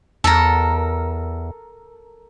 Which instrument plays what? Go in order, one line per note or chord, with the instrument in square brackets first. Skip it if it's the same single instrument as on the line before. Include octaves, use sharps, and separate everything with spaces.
[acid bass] E2 [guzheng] A4 A#4